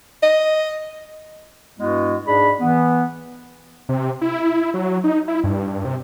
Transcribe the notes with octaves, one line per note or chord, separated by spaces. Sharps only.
D#5
G2 G#3 B3 E4 F#4
G#2 D4 G#4 D5 B5
E3 B3
C3
E4
F#3
D#4
E4
G2
C3